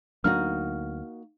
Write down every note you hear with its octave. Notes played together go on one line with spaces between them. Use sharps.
D2 F#3 A#3 D4 D#4 F#4 F6